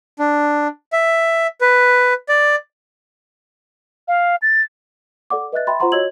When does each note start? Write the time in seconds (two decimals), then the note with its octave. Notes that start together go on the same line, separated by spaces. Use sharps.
0.19 D4
0.93 E5
1.61 B4
2.29 D5
4.08 F5
4.42 A6
5.30 A4 D5 F#5 D6
5.52 B4 D#5 E5 F#6 A6
5.67 E5 G5 B5 C6 A6
5.80 F4 C5 F#5 A#5 C6 C#6
5.92 F#4 C#5 D#5 E6 G#6 F#7